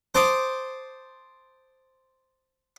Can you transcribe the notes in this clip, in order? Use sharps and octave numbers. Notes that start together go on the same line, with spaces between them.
C5 A5 C6 D6 D#6